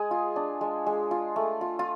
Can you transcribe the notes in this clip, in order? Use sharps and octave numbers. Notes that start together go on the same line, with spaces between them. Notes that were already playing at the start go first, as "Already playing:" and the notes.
Already playing: G#3 G#4
F4
D4
G#3
G#3
F4
A3
F4
F4